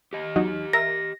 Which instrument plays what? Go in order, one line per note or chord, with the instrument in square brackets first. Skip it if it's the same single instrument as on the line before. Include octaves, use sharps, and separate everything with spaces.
[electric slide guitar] G4 D#5
[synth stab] E2 F#3 D#4
[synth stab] A#4 E5 [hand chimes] A#6